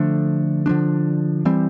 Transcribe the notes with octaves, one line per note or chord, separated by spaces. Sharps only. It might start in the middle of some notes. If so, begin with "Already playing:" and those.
Already playing: D3 F3 A3 D4
D3 F3 A3 D4
E3 G3 C4